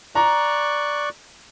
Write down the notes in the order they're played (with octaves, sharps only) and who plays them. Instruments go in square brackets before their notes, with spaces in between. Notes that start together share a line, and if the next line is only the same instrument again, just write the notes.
[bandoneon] D5 C#6 F#6 [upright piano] A#5